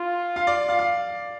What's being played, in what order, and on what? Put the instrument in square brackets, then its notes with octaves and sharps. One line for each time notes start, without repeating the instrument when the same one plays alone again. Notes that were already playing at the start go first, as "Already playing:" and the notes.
Already playing: [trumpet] F4
[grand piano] F5
D5
F5
F5